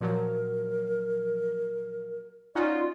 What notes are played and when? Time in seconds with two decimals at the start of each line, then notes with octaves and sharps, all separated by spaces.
0.01 A#2 F3 F#3 A#4
2.55 C#4 D#4 F4 F#4 D5